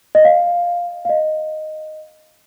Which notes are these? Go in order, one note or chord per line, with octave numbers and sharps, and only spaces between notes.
D#5
F5
F5
D#5